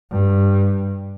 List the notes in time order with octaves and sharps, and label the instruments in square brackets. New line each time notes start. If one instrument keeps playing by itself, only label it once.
[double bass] G2